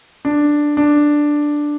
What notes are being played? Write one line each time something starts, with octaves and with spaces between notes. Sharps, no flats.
D4
D4